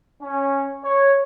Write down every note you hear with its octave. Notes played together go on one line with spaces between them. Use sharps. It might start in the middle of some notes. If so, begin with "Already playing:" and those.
C#4
C#5